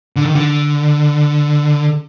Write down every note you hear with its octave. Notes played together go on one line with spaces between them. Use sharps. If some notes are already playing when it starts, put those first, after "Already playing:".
D3
D#3
D3